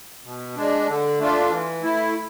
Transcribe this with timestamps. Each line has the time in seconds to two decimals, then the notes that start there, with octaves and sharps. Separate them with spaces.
0.24 B2
0.56 G#3 D4
0.87 D3
1.19 A3 D4 F4
1.50 E3
1.82 A3 E4